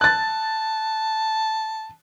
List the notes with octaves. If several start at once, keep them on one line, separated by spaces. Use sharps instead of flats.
A5 F#6 A6